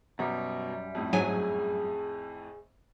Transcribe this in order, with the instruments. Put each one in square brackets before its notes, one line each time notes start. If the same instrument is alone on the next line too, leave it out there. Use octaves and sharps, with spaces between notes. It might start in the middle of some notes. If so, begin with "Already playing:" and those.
[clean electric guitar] F#2 G3 [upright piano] B2 A#5
[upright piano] F2 A2
[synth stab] G#2 F#3 G#5 [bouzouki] G#4